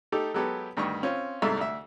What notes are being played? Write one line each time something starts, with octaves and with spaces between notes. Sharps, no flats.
A3 D#4 G4 A4
F#3 G#3 B3 G4 A4
D2 G2 D#3 C#6
C4 C#4 F4
C2 G#2 A3 E5
D2 E5